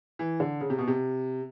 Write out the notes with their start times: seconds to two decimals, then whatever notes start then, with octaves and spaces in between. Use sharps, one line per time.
0.19 E3
0.40 D3
0.61 C#3
0.70 C3
0.78 B2
0.88 C3